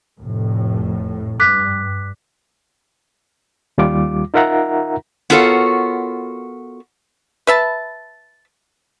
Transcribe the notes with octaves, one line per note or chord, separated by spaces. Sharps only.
F1 A2
G2 D6 F#6 B6
D#2 G3 F4 D6
D#4 F4 A#4 E5 F#5 A#5
B3 F4 F#4 A4 A#4 C#5
B4 E5 A5